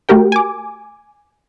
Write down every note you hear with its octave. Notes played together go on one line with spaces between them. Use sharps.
A3 F#4 G4 A#4 G5
G#5 D6